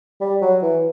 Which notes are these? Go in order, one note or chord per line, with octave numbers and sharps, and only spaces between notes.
G3
F#3
E3